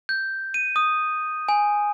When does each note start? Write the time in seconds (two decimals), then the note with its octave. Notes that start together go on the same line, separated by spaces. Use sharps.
0.09 G6
0.54 D#7
0.76 D#6
1.48 G#5